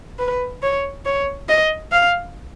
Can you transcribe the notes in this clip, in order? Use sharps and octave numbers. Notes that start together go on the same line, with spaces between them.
B4
C#5
C#5
D#5
F5